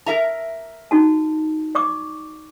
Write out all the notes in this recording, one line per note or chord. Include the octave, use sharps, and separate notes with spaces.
A#4 E5 A#5
D#4 F#4 A5
D5 C#6 D6